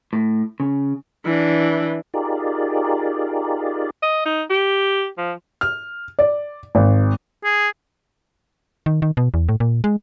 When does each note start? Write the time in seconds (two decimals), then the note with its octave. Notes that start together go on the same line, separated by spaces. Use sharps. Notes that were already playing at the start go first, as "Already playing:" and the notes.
0.13 A2
0.60 C#3
1.25 E3 D4
2.14 D#4 F4 G4 G#4 A#4 D5
4.03 D#5
4.26 D#4
4.50 G4
5.18 F3
5.61 F6
6.19 D5
6.75 G#1
7.44 G#4
8.86 D#3
9.02 D#3
9.17 B2
9.34 E2
9.49 A2
9.60 A#2
9.84 G#3